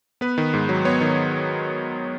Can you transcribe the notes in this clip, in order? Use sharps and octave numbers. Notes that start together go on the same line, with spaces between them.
B3 B4
D#3
G#2
F#3
B3 C#5
D#3